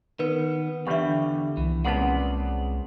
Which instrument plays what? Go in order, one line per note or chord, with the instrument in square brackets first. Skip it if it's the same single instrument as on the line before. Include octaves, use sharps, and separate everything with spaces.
[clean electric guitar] D#3 B3 [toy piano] A#4 B4
[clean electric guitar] E2 D3 [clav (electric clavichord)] G3 B4 F5 [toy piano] G4 E5
[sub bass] C2 [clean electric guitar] E3
[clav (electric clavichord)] A#2 C#3 B3 [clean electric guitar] G#3 C4 D5 [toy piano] F#5 A5